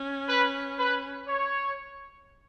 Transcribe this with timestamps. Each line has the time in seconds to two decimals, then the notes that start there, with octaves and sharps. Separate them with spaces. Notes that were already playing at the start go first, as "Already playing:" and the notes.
Already playing: C#4
0.29 B4
0.79 B4
1.28 C#5